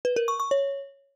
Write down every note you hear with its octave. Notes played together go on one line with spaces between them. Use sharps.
B4
A#4
C#6
C#6
C#5